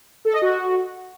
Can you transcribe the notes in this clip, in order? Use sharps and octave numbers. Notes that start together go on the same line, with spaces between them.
A4
D#5
F#4